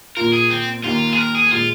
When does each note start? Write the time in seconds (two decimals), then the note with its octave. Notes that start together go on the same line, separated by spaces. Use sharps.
0.17 A#2 A#3 F4 A#4
0.33 G#4
0.50 C4
0.84 D#2 D#3 A#3 F4
1.12 G#4
1.17 A#4
1.35 G#4
1.51 A#2 G#3 F4